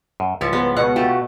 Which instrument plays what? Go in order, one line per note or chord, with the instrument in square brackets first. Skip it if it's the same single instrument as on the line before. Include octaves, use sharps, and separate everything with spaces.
[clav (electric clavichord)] F#2
[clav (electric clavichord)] C#2 E4 C#5 [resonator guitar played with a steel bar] G#2 F3 G3
[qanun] G#3 B3
[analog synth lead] B2 [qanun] F#5
[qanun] A3 [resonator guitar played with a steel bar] F4 G4